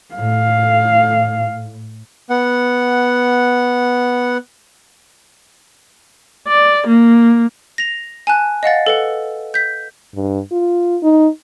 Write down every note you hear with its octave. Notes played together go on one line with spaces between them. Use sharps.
A2 F5
B3 F#5
D5
A#3
A#6 F7
G#5 A5 F#6
D#5 F5 F#5 A6
A4 B4 F#5
G6 B6
G2
F4
D#4